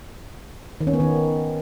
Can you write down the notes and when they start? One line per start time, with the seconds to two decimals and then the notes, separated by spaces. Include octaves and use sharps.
0.81 D#3
0.87 C#4
0.93 B3
1.00 D#3